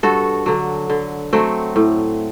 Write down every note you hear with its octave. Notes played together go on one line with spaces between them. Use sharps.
G2 F#4 A4
D3 F#3
D3
F#3 A3 C4
A2